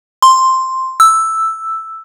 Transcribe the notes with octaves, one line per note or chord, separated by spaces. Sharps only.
C6
E6